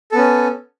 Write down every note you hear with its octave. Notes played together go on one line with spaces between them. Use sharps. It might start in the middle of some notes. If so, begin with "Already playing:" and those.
B3 C#4 A4